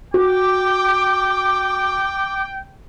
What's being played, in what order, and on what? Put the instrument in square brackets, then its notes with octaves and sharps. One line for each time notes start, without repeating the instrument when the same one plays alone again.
[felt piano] F#4 [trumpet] G5 [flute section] D6